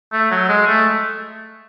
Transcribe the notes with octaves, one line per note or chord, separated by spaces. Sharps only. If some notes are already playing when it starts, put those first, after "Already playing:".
A3
F#3
G#3
A3